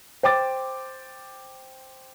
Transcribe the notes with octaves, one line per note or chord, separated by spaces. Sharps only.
C5 G5 D6 A6